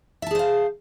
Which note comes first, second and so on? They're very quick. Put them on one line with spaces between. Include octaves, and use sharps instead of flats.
E5 A5 G#4 C5 F5